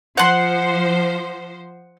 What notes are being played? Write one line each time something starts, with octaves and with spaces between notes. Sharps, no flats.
F3 C5 F#5 C6